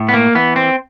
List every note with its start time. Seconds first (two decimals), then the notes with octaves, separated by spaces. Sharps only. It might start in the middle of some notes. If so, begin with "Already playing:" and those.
Already playing: A2
0.09 B3
0.14 A#3
0.35 E3 B3
0.56 C4